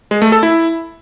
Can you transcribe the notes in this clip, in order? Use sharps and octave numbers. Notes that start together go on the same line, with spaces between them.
G#3
A3
A4
E4